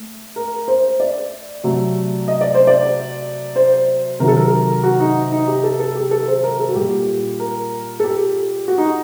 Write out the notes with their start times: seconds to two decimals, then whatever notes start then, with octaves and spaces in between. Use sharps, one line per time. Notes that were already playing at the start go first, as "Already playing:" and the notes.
Already playing: A3
0.36 A#4
0.68 C5
1.00 D5
1.64 C3 F#3 A3
2.28 D#5
2.41 D5
2.54 C5
2.67 D5
3.56 C5
4.20 C3 D#3 F#3 A#4
4.28 A4
4.37 A#4
4.83 F#4
5.00 D#4
5.32 D#4
5.47 G4
5.63 A4
5.80 A4
5.95 G4
6.11 A4
6.28 C5
6.44 A#4
6.60 A4
6.69 F#4
6.75 A#2 G3 G4
7.40 A#4
8.00 A4
8.04 G4
8.68 F#4
8.78 D#4